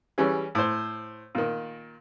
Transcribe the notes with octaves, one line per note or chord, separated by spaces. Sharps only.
E3 G3 C#4 G#4
A2 C5
A#2 D#3